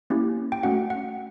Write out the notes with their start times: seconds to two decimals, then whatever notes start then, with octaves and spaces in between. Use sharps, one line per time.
0.10 A#3 C#4 E4 G4
0.52 G5
0.63 A3 C#4 F#4 F#5
0.90 F#5